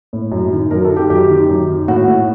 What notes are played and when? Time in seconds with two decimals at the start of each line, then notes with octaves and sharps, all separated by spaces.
0.13 A2
0.32 F#2
0.52 D#3
0.71 F#2 A#4
0.85 A4
0.91 D#3
0.97 G4
1.10 F#2 G4
1.30 D#3
1.49 F#2
1.68 D#3
1.88 A2 F#4
2.08 A2